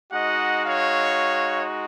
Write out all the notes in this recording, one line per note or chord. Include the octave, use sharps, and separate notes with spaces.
G#3 D#4 F#4 D#5 F#5
C#5 F5